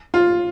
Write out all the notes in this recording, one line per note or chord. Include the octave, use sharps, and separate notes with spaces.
F4